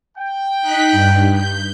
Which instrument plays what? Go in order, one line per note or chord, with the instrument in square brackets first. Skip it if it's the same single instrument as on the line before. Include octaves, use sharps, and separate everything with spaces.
[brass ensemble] G5
[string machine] D#4 F#6 B6
G2
G6